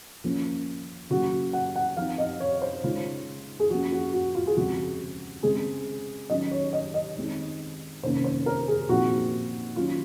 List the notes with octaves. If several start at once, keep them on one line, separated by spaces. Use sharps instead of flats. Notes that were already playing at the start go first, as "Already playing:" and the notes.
F3 A#3 C#4
C#3 F#3 A#3 F#4
F#5
F#5
F3 C4 D#4 F5
D#5
C#5
C5
C#3 G#3 D#4 F4
G#4
F3 A#3 C#4 F#4
F#4
F#4
F4
G#4
C#3 F3 G#3 C4 F#4
C#3 G#3 C4 G#4
D#3 F#3 C#4 D#5
C#5
D#5
D#5
D#3 G#3 C4 D#4
C3 D#3 A#3 C#4 C5
C5
A#4
G#4
A#2 F3 C4 D#4 F#4
D#3 F#3 C#4 F4